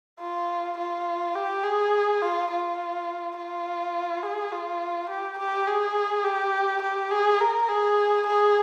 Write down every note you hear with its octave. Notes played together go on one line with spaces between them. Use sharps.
F4
F4
G4
G#4
F4
F4
F4
G#4
F4
G4
G4
G#4
G4
G4
G#4
A#4
G#4
G#4